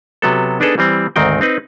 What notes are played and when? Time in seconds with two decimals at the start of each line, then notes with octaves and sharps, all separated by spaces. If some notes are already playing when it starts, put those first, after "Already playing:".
0.22 C3 F#3 B3 A4
0.60 B3 D4 D#4 G#4 A4 B4
0.78 E3 G3 C4
1.16 D2 G#2 D#3 C4 D#4 G5
1.41 C4 D#4 B4